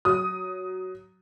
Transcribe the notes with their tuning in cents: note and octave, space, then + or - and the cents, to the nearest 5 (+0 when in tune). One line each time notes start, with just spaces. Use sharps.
F#3 +10 D#6 +15